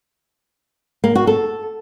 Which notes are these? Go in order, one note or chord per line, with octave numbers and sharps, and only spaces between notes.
A#3
F#4
A4